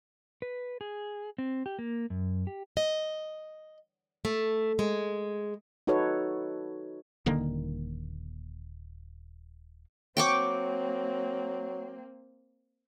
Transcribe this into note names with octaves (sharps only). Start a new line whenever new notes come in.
B4
G#4
C4
G4
A#3
F#2
G4
D#5
A3
G#3
D#4 F#4 A4 B4 C#5
D#1 D3 D#3 A#3
F#3 A#3 C4 G5 C#6 D6